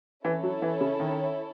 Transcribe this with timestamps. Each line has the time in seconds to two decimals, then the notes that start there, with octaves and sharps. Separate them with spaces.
0.24 E3 C#4 E4 A4 C#5
0.43 F#3
0.62 E3
0.81 C#3
1.00 D#3